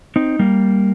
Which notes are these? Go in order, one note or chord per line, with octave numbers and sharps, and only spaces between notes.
C4 D#4
G3 A#3